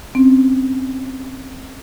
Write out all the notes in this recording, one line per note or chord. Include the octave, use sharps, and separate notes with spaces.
C4 C#4